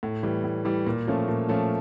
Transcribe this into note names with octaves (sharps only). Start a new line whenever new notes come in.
A2
E3 G3
A2
E3 G3
A#2
F3 A3 C#4
A#2
F3 A3 C#4